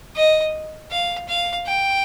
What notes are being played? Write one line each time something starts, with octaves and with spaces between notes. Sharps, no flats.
D#5
F5
F5
G5